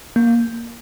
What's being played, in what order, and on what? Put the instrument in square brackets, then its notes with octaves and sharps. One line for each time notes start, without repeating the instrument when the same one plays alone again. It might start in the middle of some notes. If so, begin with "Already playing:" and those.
[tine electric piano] A#3